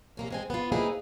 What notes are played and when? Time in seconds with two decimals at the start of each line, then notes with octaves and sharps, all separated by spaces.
0.17 C3 A#3 C#4
0.30 G#3 C4 G#5
0.50 B3 F4
0.72 A#3 C4 D#4 E4 G#4 B4